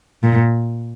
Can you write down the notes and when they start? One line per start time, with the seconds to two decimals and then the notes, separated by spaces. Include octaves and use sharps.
0.23 A#2